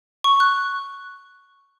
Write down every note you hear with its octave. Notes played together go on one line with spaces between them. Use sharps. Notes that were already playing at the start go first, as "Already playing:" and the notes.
C#6
F#6